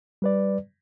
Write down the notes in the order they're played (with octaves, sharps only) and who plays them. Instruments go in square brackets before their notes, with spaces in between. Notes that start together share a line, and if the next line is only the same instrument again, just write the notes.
[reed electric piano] G3 B4 D5